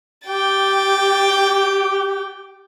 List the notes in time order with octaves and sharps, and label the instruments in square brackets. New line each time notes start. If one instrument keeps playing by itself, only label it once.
[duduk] G4 [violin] G5 A6